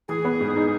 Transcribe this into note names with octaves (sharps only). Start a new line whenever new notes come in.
E3 G#4
B3
G#2
D#4